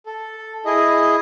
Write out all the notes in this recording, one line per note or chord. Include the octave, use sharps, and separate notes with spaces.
A4
E4 G#4 D#5